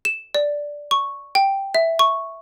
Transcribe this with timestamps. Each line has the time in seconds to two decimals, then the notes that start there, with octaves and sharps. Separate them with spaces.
0.05 E7
0.35 D5
0.91 C#6
1.35 G5
1.75 E5
1.99 C#6